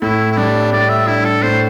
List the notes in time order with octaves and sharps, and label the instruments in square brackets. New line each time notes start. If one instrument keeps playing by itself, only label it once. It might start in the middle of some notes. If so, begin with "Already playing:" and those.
[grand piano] A2 [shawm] E4
[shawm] E4
[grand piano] G3 [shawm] D4
[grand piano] A2 [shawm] D5
[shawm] E5
[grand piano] D4 [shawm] E4
[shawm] A4
[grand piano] A2 [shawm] C5